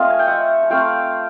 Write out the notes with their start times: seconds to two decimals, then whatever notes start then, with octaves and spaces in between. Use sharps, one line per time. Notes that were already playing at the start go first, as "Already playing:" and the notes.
Already playing: A3 C4 F4 D#5 F5
0.10 G#5
0.19 G5
0.27 E5 F#5
0.62 G#5
0.70 A3 C4 F4 F5 G5